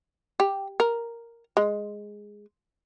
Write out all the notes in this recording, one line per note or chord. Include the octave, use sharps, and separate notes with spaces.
G4
A#4
G#3